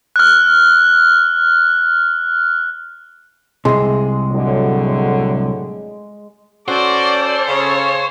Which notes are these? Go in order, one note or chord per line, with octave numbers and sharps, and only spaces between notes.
F6 F#6
C2 C3 G#3
A2 D3 F#3
C#4 F#4 A4 C5 D5
C#3 C#5